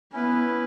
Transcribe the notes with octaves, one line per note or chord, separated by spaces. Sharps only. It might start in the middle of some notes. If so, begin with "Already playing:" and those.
B3 C#4 E4 B4